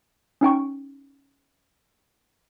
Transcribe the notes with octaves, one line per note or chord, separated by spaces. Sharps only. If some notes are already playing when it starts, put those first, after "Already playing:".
C#4 D#4 G5 C#6